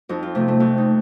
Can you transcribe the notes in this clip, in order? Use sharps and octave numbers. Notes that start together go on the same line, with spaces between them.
F2 D#4
F4
C3 F3 A3
A3
F2 A3
D#4